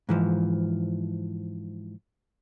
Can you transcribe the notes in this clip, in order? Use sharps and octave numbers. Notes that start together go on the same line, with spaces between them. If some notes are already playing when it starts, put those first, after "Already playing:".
G#2 E3 F3